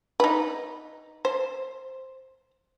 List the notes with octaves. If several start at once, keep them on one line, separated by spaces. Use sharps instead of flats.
D#4 B4
C5